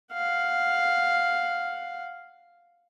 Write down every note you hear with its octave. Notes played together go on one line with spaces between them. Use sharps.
F5 F#5